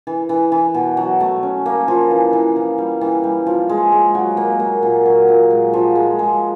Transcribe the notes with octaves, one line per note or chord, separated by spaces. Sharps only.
E3
E3
E3
B2
F#3
A3
C#4
A#3
F3
E3
E3
E3
G3
E3
G3
F3
G#3
G#3
F#3
A#3
A#3
A#2
F#3
A#2
G#3
F3
G#3
G#3